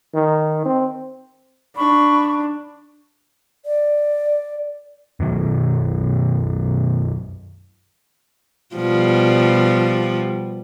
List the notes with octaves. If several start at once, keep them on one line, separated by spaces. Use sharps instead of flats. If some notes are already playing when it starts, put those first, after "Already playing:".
D#3
C4
D4 B5 C#6
D5
F#2 B2 D#3 F#3
B2 F3 G3